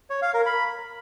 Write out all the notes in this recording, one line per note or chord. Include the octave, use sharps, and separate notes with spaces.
C#5
F5
A#4
B5